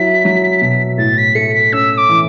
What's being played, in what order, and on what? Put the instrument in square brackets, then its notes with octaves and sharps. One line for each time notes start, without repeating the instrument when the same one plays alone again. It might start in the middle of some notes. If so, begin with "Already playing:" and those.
Already playing: [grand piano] F#3 E4 [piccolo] B6
[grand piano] F#3
B2
[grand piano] A2 [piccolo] A6
[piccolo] B6
[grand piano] A3 [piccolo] C#7
[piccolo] B6
[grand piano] C#4 [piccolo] E6
[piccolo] D6
[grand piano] E3